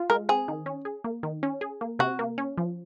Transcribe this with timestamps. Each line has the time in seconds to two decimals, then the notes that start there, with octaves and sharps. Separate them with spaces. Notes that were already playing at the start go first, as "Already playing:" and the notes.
Already playing: F4
0.10 G#3 A#4
0.29 C4 G#4
0.48 D#3
0.66 C#4
0.85 G#4
1.04 A#3
1.23 D#3
1.43 C#4
1.61 G#4
1.81 A#3
1.99 C3 F#4
2.19 A#3
2.38 C#4
2.58 F3